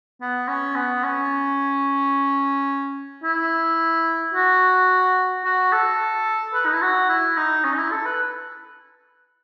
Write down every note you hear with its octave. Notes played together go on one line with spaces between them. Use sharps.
B3
C#4
B3
C#4
E4
F#4
F#4
A4
B4
D#4
E4
F#4
E4
D#4
C#4
D#4
E4
A4
B4